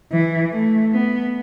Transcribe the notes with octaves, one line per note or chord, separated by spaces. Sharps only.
E3
A3
B3